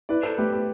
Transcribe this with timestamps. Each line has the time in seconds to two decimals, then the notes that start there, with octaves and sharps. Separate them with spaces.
0.09 E4 B4 D5
0.23 A4 C5
0.37 A3 G4 B4
0.52 G4 B4